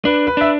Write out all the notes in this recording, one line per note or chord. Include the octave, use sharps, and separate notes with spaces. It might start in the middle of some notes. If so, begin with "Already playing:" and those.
D4 B4
B4
D4 E5